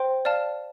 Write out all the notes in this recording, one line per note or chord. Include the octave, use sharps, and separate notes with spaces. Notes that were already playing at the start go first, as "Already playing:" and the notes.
Already playing: C5 G5 C6
D5 F5 A5 F6